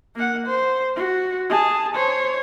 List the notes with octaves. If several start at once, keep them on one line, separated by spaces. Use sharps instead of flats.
A#3 F#5
C5
F#4
G#4 A5
C5 C#5